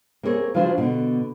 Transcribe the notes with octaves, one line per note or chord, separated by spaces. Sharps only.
A#3 C4 E4 G#4 C#5
C#3 F3 F#3 D4 F4 C5
B2 D3